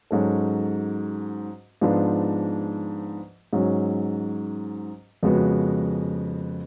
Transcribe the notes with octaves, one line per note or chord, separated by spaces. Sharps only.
G#2 F#3 C#4 F#4 A4
G#2 F3 B3 D4 F4
G#2 F#3 C#4
F2 C#3 G#3 B3 F#4